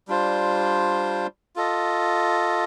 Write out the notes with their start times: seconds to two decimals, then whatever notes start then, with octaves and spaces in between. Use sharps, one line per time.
0.08 G3 D4 F4 C5
1.56 F4 A4 D#5